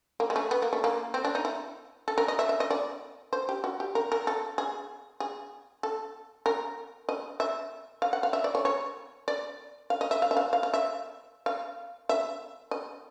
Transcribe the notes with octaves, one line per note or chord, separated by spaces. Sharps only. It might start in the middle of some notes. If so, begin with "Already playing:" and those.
A#3
G#3
A3
B3
A#3
A3
A#3
C4
D4
D#4
E4
A4
A#4
D#5
E5
E5
D#5
D5
C5
G4
F#4
G4
A#4
A#4
A4
G#4
G#4
A4
A#4
D#5
E5
F5
F#5
F5
E5
D5
C#5
C#5
D5
F5
D#5
E5
F5
E5
F5
F5
F5
E5
F5
E5
D#5